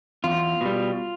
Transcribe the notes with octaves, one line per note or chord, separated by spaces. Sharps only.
E2 F4
B2 G3